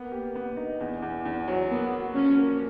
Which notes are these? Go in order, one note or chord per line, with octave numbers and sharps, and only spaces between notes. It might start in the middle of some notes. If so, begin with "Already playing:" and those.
Already playing: A#3 B3
G4
B3
D#4
E2
E2
E2
F#3
A#3 B3
F#4
F3 C#4
A#3